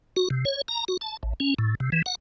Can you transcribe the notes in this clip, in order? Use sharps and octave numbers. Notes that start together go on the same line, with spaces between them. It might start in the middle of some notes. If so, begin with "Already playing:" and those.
F#4
C3
C#5
A#5
F#4
A5
A1
C#4
A2
C3
E3
F#5